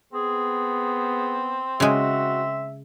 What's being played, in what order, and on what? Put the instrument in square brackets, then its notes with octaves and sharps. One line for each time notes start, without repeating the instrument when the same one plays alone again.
[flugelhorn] B3 [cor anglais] C4 [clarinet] G#4
[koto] C#3 G#3 [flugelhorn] F#4 [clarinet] E5